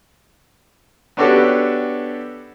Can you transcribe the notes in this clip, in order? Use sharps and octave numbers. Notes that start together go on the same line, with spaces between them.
B3 D4 F#4 G4 A4 C#5